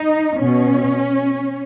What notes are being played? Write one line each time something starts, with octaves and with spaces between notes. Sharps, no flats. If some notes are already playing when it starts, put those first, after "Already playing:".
Already playing: D#4
B2 C#4